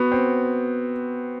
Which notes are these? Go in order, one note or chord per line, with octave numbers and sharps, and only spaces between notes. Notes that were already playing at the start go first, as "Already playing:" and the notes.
Already playing: B3 F#4
C4